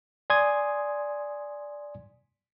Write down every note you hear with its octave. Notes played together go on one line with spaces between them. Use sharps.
D5 G#5 C6 D#6 G#6